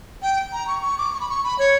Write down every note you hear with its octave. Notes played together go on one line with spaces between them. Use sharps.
G5
A#5
C#6
C#6
D6
C#6
B5
C#6
B5
C#5